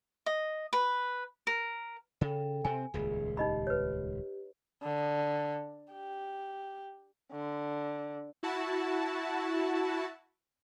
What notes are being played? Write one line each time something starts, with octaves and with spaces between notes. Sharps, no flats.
D#5
B4
A#4
C#3 A4 G5
C3 C4 G#5
D#1 C#2 G#4
D#4 G4 D#5 B5
B4 C#5
D3
G4
D3
E4 F#4 A5